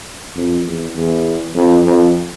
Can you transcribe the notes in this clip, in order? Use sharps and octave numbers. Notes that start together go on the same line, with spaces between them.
F2
E2
E2
F2
F2